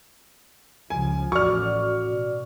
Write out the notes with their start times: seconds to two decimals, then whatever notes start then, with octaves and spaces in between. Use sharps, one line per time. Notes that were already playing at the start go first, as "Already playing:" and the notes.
0.90 C#2 F3 G#5
1.32 A1 F#4 D5 C#6 F6
2.09 B2